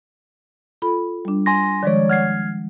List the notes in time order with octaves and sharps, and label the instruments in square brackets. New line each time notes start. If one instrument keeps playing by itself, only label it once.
[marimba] F4 A4 B5
G3 D4
[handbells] G#5 C6 A#6
[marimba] D#3 F3 G#3 [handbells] C#5 D5
[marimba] F#5 [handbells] F6 G#6 C7